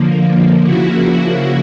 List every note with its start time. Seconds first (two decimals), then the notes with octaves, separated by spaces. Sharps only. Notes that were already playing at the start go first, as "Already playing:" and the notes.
Already playing: D3 F3 A#3
0.64 C#3 F3 A#3 E4 F#4